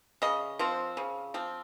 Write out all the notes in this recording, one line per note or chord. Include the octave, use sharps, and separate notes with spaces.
C#3 D#5
F3 C4
C#3
F3 C4